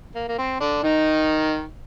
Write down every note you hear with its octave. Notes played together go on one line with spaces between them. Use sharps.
A#3
A#3
C4
D3 D4
D#3 D#4